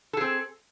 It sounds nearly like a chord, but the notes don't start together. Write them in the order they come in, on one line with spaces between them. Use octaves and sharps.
A4 G#4 C4